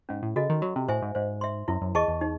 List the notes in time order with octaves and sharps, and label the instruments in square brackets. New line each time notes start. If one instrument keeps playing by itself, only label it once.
[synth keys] G#2 [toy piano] C#4
[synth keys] A2
[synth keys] C#3 [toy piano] F#4 A4 D#5
[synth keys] D#3
[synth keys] F#3 [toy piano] F#4
[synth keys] C3
[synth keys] A2 [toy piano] C5 E5 G#5
[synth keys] G#2
[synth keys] G#2 [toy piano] C5
[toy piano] E5 C6
[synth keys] F#2 [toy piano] E4
[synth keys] F#2
[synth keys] E2 [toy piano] G#4 D#5 A5 C#6
[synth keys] E2
[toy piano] D#4